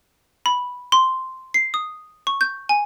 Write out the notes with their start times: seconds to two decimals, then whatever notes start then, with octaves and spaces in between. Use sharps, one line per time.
0.46 B5
0.92 C6
1.54 C7
1.74 D#6
2.27 C#6
2.41 G6
2.69 G#5